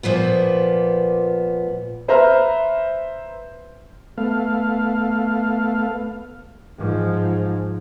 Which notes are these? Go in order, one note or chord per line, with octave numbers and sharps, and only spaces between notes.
A#2 F3 A#3 B3
B4 C5 E5 A#5 F6
A3 B3 F5
G#2 F3